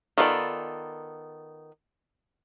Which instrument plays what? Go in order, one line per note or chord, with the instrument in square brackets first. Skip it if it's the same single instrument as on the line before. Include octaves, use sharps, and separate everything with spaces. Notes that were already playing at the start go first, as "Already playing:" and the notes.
[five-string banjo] D#3 B3 F4 A4 D5